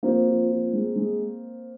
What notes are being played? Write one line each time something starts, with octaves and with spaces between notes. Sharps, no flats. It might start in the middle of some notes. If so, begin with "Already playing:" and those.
F3 A#3 C4
F3
F3
G#3
G#3